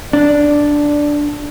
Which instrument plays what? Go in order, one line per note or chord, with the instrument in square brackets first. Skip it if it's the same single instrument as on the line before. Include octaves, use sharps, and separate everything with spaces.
[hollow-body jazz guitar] D4 [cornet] D5